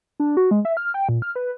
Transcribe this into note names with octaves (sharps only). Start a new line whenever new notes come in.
D4
F#4
G#3
E5
F6
G5
A#2
F6
B4